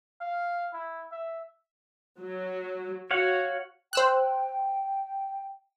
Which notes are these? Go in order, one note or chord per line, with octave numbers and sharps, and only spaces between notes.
F5
E4
E5
F#3
F#4 C#5 F5 F#5
C5 G5 E6 F#6